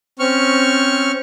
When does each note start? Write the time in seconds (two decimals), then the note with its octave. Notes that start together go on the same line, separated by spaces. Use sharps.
0.19 C4 C#4 C#6 F6